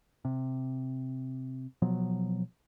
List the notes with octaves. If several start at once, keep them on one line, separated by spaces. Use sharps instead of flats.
C3
B2 F3 F#3 B3